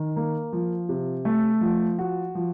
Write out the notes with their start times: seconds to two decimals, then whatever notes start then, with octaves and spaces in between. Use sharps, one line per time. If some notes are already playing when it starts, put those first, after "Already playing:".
Already playing: D#3
0.16 A#3
0.53 F3
0.89 C3
1.25 A3
1.61 F3
1.99 F#4
2.35 F3